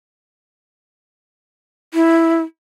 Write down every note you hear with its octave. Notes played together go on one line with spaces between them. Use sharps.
E4